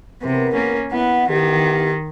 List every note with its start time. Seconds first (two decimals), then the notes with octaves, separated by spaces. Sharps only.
0.23 E2 C3 B3 A#4
0.53 A#3 C#4
0.92 B3 E4 F#5
1.29 D#3 B3 E4 G4